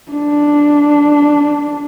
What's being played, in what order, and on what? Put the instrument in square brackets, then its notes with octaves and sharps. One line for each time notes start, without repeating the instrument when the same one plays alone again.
[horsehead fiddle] D4